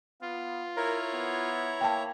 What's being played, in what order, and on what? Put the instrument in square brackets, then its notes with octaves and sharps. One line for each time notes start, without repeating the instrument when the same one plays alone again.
[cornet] B3 [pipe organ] F4
[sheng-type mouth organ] E4 C#5 A#5 [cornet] A#4
[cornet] B3
[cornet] A#3 [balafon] G5 A5